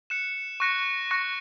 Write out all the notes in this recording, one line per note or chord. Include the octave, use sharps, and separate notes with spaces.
F#6 C#7 E7
C#6 F#6 A#6 C#7
C#6 F#6 A#6 C#7